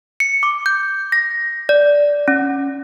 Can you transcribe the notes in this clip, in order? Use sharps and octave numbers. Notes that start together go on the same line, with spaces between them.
C#7
D6
G6
A#6
D5
C#4